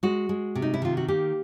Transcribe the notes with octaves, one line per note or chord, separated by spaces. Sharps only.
G#3 F#4
G#3
C3
D#4
E4
D#3 F4
F#4
A#3 G4